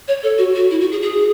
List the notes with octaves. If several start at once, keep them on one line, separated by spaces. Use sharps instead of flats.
C#5
A4
F#4
F#4
E4
F#4
G#4
G#4